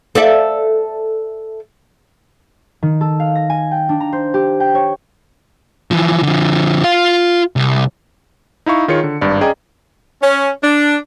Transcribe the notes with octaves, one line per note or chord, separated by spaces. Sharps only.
A4 D5 E5
D#3
A4
F5
A#6
G#5
G5
D4
A#5
C5
G4
G5
C#5
E3 F3
D3 F3
F4 F5
C2
D#4 E4 F5 C#6
D#3 F4 G#4 C#5 C#7
D3
G#1 G2 D5
C#4 G#4 D5 D#5 G5 A#5
C#4
D4